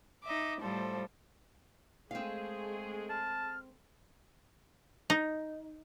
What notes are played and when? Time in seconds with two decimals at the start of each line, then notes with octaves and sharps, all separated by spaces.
0.24 D#4 D#5 E5 D6
0.60 A2 F3 G3 A4 C5
2.11 G#3 A3 C4 G#4 F5
3.09 A5 F6
5.10 D#4